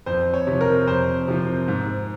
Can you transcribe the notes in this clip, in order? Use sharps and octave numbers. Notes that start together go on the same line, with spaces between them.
F2 C5
C#5
C3 F3
A#4
F2 C5
C3 F3
G#2